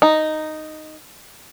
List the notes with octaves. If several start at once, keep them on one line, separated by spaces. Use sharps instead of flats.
D#4